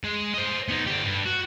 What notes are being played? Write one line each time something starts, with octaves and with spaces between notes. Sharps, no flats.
G#3
C5 D#5
B3 D#4
D3 G4
G2
F#4